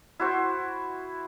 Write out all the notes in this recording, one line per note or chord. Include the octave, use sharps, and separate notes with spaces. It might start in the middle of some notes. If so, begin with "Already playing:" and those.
E4 F#4 C5